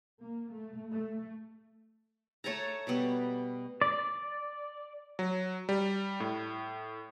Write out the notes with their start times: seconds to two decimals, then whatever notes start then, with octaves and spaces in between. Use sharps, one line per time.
0.22 A#3
0.54 A3
0.91 A3
2.44 A3 C#5 A5 A#5
2.87 B2 G3 B3
3.82 D5
5.19 F#3
5.69 G3
6.20 A2